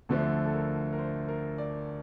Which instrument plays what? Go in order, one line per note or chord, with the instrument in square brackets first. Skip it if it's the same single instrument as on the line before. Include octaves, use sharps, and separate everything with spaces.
[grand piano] D2 D3 F3 A3 A4
A4
A#4
A#4
C5
A#4
D5